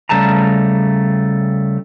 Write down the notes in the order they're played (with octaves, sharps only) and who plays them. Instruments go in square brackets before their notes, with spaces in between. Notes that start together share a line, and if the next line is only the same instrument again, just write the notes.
[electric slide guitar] C#3 G3 A3 A5 A#5